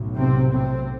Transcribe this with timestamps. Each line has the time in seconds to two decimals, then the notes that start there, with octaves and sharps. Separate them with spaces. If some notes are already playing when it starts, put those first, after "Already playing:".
Already playing: B1 A2
0.15 C3 C4
0.53 C3 C4